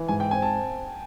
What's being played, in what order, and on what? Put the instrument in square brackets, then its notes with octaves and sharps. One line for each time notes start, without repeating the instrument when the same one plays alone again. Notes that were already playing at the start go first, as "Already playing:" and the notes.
Already playing: [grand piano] E3
[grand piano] G#2 [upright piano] G#5
[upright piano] G5
[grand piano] C4 [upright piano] G#5
[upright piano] A5